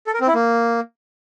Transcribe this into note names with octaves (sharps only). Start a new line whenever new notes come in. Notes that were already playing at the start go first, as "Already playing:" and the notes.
A4
A#4
C4
E4
A#3